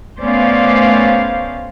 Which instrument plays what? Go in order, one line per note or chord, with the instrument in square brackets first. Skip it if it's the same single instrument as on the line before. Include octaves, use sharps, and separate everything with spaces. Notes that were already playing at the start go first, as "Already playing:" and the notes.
[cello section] A3 B3 C#4 C5 D5 F5